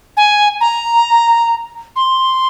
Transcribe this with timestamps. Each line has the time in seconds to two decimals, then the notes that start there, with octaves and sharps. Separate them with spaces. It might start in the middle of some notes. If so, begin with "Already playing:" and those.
0.17 G#5
0.61 A#5
1.96 C6